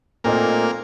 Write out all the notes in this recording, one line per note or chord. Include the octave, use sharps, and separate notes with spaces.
A#2 A3 A#3 C4 D#4